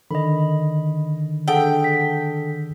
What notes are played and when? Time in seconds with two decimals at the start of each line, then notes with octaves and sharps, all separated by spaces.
0.11 D3 D#3 D#5 B5
1.48 D4 G#4 A4 F#5 G5
1.84 B6